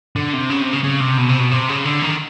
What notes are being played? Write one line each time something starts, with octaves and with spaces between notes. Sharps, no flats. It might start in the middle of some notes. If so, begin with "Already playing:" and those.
D3
C3
C#3
C3
C#3
C#3
C3
B2
C3
B2
C3
C#3
D3
D#3